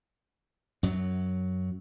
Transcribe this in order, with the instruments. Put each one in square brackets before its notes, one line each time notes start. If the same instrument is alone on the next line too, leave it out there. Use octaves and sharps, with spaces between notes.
[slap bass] F#2 F#3